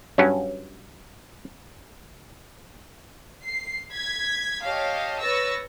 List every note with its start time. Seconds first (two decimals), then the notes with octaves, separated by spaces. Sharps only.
0.18 G2 F#3 C#4
3.45 C7
3.92 G#6 B6
4.64 G4 C#5 D#5 F5 A5
5.21 B4 C#5 C#6 E6 A6 A#6